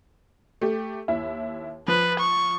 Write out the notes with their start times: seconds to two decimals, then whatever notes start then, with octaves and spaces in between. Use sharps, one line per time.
0.61 A3 G4
1.08 D#2 E4 E5
1.88 F3 B4
2.19 C#6